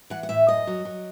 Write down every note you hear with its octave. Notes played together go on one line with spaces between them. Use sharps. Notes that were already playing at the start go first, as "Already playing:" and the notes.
E3 F#5
F#5
A2 E5
F#2 D#5
F#3
F#3